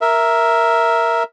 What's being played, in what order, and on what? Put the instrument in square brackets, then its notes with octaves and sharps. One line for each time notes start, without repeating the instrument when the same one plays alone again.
[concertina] A#4 E5